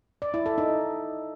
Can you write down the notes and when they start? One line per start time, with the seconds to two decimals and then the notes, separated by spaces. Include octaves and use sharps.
0.22 D5
0.34 E4
0.46 A4
0.58 D#4